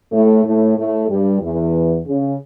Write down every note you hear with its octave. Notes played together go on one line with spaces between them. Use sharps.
A2 A3
A2 A3
A2 A3
G2 G3
E2 E3
C#3